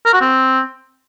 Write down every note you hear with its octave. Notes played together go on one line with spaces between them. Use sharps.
A#4
F#4
C4